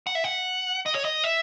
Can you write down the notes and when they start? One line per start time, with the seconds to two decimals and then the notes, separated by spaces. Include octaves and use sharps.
0.07 F#5
0.15 E5
0.24 F#5
0.86 D#5
0.95 C#5
1.05 D#5
1.24 E5